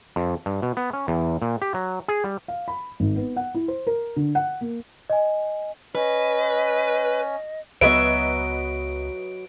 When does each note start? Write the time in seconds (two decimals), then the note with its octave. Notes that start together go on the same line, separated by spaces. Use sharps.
0.16 F2
0.46 G2
0.62 B2
0.77 B3
0.93 C#4
1.08 E2
1.42 A#2
1.62 G4
1.74 F#3
2.08 G#4
2.24 G3
2.48 F5
2.68 B5
3.00 G#1
3.16 B3
3.36 F#5
3.54 E4
3.68 C5
3.87 A#4
4.16 D3
4.35 F#5
4.61 A#3
5.10 D#5 G#5
5.95 C#4 B4 D#5
7.81 C#2 F#3 B3 B4 D#5 E5 D7